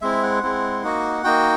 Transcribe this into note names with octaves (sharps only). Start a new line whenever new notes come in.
G#3 C4 E4 E5
F#5
G#3 C4 E4
A#3 D#4 F#4
A#3 D#4 F#4 G5